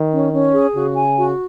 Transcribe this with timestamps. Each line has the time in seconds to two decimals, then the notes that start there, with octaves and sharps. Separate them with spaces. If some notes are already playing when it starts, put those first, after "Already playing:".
Already playing: D#3
0.12 C#4
0.33 C#4
0.54 G#4
0.75 C#3 F#4
0.96 G#5
1.18 F#4